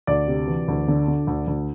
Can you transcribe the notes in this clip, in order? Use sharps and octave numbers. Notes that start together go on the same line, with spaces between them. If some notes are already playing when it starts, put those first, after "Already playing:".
D2 D5
C3
E3
D2
D3
D3
D2
D2